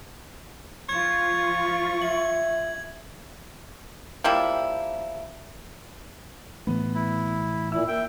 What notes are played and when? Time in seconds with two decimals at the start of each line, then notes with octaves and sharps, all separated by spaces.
0.89 F3 F4 C#6 G#6
2.02 E5 F#7
4.24 F3 G3 A#3 E4
6.67 A2 E3 A3 B3
6.94 E4
7.72 A#2 E4 E6
7.88 A#3 E5 G5